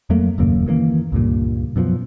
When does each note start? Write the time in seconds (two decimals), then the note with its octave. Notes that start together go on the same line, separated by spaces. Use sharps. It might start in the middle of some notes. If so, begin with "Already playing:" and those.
0.10 F2 F#3 A3 A#3
0.38 D#1 F#2 C#3 A#3
0.67 D#3 E3 G#3 A#3
1.12 C#2 G2 A#2
1.76 F#2 B2 D3 F3